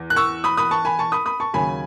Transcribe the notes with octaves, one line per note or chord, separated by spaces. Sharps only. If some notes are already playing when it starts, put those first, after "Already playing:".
Already playing: E2
F#6
C#6 E6
B5 D#6
B5 D#6
A5 C#6
G#5 B5
A5 C#6
B5 D#6
B5 D#6
A5 C#6
D#2 C#3 F#3 G#5 B5